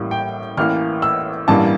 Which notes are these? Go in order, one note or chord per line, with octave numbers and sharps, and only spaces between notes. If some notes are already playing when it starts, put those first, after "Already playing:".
Already playing: A1 A2 G3 A#3
G5
A1 A2 E3 A#3 F6
E6
A1 G2 E3 G3 A#3 A5